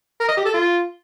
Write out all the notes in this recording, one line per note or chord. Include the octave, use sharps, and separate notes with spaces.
A#4
D#5
G4
A4
F4